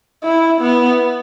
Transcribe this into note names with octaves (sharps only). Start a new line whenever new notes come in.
E4
B3